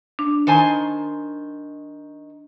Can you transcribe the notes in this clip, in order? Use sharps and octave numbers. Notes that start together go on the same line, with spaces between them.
D4
D#3 C5 G#5